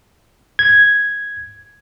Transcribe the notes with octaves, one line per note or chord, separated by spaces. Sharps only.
G#6